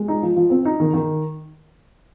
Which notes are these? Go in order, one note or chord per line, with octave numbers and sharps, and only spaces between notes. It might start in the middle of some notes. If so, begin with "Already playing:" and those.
Already playing: G#3
D#4
F3
F3
C4
D#4
D#3
D#3